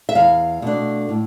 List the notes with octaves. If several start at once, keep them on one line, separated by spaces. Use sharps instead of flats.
E5
E2 F5
B2 A3 D4
A2